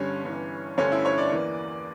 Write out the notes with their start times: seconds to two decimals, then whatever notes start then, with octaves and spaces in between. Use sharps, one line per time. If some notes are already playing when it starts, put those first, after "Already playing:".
Already playing: G1 G2 D3 G3 C#4 C#5
0.25 G1 G2 E3
0.78 G1 G2 D3 F3 A3 C#4 C#5
0.92 E4 E5
1.05 C#5 C#6
1.18 D5 D6
1.31 E2 E3 A#3